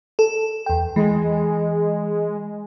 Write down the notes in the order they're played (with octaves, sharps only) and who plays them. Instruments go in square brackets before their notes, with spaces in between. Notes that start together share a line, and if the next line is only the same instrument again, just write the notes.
[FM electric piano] A4
E2 G5
[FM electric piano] E3 [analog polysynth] G#3